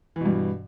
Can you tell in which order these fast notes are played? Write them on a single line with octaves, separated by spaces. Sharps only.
E3 B2 G2